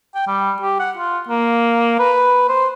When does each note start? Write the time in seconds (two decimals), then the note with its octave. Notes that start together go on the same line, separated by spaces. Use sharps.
0.15 G5
0.27 G3
0.61 G4
0.80 F#5
0.97 F4
1.28 A#3
1.99 B4
2.49 C5